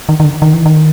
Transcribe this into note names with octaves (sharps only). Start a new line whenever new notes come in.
D#3
D#3
D3
D#3
E3
D#3